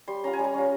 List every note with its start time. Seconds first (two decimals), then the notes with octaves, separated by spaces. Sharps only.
0.08 G3 C6
0.24 C#4 F4 A#5
0.33 G#5
0.39 G3
0.44 A#5
0.54 C#4 F4